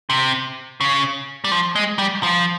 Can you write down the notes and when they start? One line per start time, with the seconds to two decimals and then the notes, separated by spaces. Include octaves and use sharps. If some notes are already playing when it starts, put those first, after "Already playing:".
0.10 C3
0.81 C#3
1.44 G3
1.51 F3
1.76 G#3
1.99 G3
2.23 F3